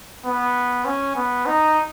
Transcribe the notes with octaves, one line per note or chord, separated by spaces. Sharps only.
B3
C#4
B3
D#4